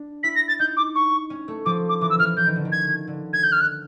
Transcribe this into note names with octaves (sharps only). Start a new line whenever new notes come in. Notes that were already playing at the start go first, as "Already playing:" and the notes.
Already playing: D4
E4 B6
A#6
A6
D#4 G6
D6
C#6
C#4
A3
F3 D6
D6
E3 D6
E6
E3 F6
E3 G6
D#3
D3
D#3
G#6
D3
G#6
G6
F6
F#6